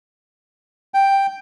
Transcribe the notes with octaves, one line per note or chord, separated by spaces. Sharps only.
G5